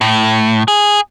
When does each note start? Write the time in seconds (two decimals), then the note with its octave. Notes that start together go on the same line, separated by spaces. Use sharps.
0.01 A2
0.68 G#4